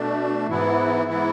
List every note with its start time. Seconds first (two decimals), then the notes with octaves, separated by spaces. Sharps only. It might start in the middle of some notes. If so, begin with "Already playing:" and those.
Already playing: B2 A3 D4
0.47 G#2 E3 B3 E4
1.06 G#2 E3 B3 E4